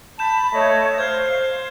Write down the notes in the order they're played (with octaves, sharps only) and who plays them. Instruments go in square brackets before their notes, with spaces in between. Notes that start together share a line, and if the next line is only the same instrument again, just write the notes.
[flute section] A5 B5 [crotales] G6 E7
[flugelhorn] A3 [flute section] C#5 D#5
[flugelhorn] C5 [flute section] F5 [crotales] F6 G6 G#6